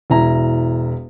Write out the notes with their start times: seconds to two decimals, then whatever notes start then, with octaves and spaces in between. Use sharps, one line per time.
0.10 E1 E4 A#5